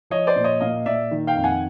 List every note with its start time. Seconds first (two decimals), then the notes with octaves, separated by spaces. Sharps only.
0.10 F3 C#5 D#5
0.27 C5 D5
0.36 A#2
0.44 C#5 D#5
0.60 A#2 D#5 F5
0.86 A#2 D5 E5
1.11 D#3
1.27 F5 G5
1.36 F2
1.44 F#5 G#5